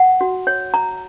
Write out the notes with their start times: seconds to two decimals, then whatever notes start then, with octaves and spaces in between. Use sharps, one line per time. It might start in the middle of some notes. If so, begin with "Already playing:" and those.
Already playing: F#5
0.21 F#4
0.47 C#5
0.74 A#5